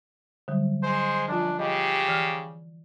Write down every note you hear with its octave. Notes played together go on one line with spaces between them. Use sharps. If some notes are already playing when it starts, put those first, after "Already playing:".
D3 F#3 G3
G#3 C5
F#2 F3 D4 F4
C#3 G4 D#5
E3 F6